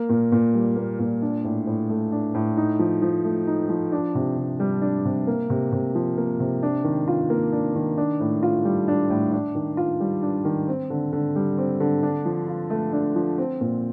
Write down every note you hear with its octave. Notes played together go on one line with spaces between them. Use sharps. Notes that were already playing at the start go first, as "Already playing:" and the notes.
Already playing: A#3
A#2
A#2
G3
A#3
A#2
D4
A2
A2
A3
D4
A2
D#4
F3
F3
A3
D#4
F3
D4
C3
C3
G3
D4
C3
A#3
C3
C3
F3
A#3
C3
D4
D#3
F4
A#3
D4
D#3
D4
A2
F4
G3
D4
A2
D4
D#3
F4
G3
D4
D#3
C4
D3
D3
G3
C4
D3
D4
F3
F4
A3
D4
F3
C4
A#2